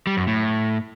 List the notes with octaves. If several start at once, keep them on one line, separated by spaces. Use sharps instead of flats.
G3
F#2
A2